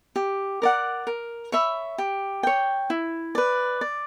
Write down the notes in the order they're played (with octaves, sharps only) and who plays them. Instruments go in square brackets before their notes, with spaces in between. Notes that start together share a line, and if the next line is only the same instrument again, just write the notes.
[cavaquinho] G4
A#4 D5 F#5
A#4
C#5 E5 B5
G4
C#5 G5
E4
B4 D5
D5